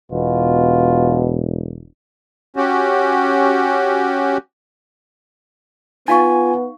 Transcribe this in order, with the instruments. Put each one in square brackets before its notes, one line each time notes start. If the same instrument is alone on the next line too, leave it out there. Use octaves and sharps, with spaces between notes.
[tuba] E1 [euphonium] B2 [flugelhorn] F4
[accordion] C#4 F#4 G4
[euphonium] B3 [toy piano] D#4 F5 C#6 [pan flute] F4 [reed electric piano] G#5